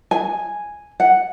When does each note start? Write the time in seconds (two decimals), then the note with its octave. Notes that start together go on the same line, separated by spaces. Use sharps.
0.11 G#5
1.00 F#5